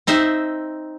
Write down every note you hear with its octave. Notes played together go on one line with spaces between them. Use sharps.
C4 D#4 C5 E5